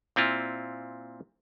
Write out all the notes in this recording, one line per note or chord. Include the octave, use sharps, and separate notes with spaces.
A#2 C4 E4 F4